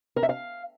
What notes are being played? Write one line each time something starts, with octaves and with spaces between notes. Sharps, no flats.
A#4
E5
F5